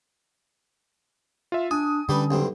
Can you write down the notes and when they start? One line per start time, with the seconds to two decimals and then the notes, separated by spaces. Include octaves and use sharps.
1.52 F4 E5
1.71 D4 G#5 D#6
2.09 D3 G3 C#4 G4 B4
2.31 B1 G2 C4